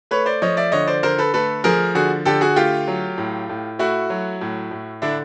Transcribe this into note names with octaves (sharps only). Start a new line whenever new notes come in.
A3 B4 C#5
C5 D5
F3 C#5 D#5
D5 E5
D3 C#5 D#5
C5 D5
D3 A#4 C5
A4 B4
A3 A4 B4
F3 G#4 A#4
D3 F#4 G#4
D3 G4 A4
F#4 G#4
A3 F4 G4
F#3
A2
A2
A3 E4 F#4
F#3
A2
A2
D3 D4 E4